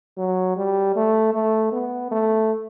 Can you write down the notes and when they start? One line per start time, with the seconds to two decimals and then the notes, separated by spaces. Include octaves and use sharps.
0.17 F#3
0.56 G3
0.95 A3
1.34 A3
1.72 B3
2.11 A3